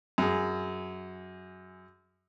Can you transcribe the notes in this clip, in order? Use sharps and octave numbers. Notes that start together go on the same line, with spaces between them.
F#2 G#4